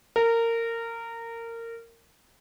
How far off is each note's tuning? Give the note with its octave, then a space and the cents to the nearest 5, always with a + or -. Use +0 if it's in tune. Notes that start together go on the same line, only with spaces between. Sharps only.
A#4 -20